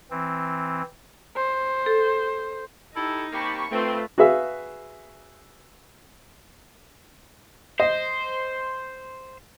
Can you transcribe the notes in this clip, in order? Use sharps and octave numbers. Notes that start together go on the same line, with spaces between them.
E3 C4
C5
A4
D#4 E4 G4 A4
A#3 C4 G4 A5 B5 C#6
A3 C4 F4 B4
F#4 G#4 B4 E5 F5
C5 D#5